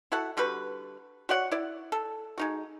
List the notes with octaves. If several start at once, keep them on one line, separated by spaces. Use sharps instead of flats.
E4 F#4 A4 F#5
D3 G3 F#4 B4
F#4 C#5 D5 F#5
E4 D5
A4
G#3 D#4 F#4